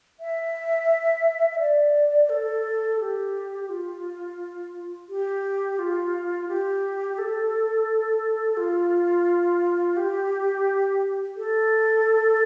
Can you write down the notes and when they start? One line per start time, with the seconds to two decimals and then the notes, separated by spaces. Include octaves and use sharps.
0.20 E5
1.50 E5
1.59 D5
2.29 A4
3.00 G4
3.70 F4
5.09 G4
5.79 F4
6.48 G4
7.18 A4
8.57 F4
9.97 G4
11.37 A4